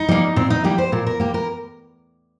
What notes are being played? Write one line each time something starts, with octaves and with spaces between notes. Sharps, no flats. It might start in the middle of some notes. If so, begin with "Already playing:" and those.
Already playing: D#4
G3 A#3
A#2 C4
D#4
G3 A#3 G4
C5
A#2 A#4
A#4
A#3 G4
A#4